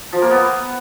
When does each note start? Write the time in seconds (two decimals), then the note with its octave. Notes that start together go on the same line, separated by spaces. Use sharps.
0.13 F3
0.22 A#3
0.31 B3